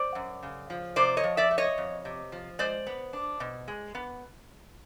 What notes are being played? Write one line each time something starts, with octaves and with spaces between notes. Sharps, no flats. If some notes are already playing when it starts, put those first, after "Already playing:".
Already playing: C5 D5
F#2
C#3
F3
C3 C5 D5
C#5 D#5
F3
D5 E5
A3
C#5 D#5
F2
C3
F3
G#3 C5 D5
B3
D4
B2
G#3
B3